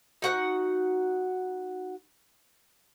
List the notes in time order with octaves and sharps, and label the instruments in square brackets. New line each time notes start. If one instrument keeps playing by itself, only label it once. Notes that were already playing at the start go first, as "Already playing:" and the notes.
[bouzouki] D#4 F#4 F#5